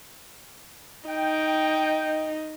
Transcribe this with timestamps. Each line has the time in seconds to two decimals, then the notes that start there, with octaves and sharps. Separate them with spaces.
1.08 D#4 G5